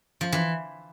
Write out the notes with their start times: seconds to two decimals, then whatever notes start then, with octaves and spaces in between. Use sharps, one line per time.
0.21 F3
0.32 E3